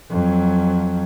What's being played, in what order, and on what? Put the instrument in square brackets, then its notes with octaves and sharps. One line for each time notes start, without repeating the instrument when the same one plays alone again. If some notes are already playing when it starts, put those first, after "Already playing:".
[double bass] F2 F#3